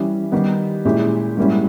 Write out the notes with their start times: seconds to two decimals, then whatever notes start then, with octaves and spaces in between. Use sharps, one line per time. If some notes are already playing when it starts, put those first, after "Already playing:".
Already playing: E3 G3 C#4
0.32 D#3 G3 B3 D#4 G4
0.85 A#2 G#3 C#4 E4 G4
1.37 G#2 G3 A#3 C#4 E4